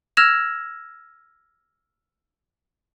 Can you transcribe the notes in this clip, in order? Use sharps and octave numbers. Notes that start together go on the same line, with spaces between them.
E6 F6 G#6 A#6 E7 F7